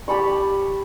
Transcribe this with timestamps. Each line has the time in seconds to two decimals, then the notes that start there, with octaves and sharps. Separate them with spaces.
0.08 G4 A5 B5 C#6